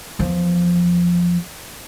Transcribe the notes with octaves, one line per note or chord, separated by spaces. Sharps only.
E2 F3